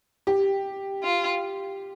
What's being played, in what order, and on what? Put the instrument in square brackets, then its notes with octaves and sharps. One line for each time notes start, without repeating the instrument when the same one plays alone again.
[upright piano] G4
[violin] F4